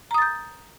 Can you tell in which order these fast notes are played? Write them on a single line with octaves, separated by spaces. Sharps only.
A#5 D#6 A6 G6